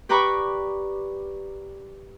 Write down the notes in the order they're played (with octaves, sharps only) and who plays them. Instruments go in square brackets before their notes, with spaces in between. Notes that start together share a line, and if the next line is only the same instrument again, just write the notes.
[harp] G4 B4 D5 A#5 B5 C#6